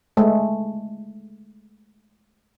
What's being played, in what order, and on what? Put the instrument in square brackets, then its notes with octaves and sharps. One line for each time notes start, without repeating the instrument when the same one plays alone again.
[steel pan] G#3 A3